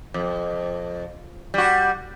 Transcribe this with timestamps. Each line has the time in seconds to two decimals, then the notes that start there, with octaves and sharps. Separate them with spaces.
0.14 F2
1.54 G3 F#4